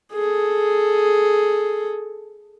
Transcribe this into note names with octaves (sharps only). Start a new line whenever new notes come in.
G#4 A4